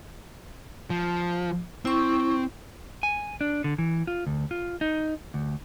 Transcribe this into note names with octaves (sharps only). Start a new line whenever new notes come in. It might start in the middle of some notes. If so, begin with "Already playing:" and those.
F3
C4 E4 C#6
G#5
D4
D3
E3
F4
D2
F4
D#4
D2